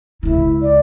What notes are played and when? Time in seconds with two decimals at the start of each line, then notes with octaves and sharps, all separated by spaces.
0.23 C#2 C#3 E4
0.62 D5